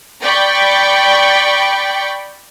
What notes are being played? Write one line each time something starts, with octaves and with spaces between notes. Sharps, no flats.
D5 G5 B5 C#6